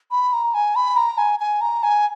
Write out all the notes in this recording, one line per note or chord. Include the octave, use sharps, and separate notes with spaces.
B5
A#5
G#5
B5
A#5
G#5
G#5
A#5
G#5